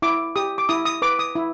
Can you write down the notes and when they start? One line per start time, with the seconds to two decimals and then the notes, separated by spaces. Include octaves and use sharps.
0.02 E4 D6
0.36 G4 D#6
0.58 D6
0.69 E4 D#6
0.85 D#6
1.02 B4 D6
1.19 D#6
1.35 E4